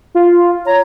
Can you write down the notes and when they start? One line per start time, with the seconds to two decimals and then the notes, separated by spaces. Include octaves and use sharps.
0.15 F4
0.66 C#5 A#5